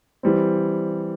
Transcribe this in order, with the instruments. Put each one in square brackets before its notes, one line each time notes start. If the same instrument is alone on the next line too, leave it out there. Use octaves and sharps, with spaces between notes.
[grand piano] E3 G3 C4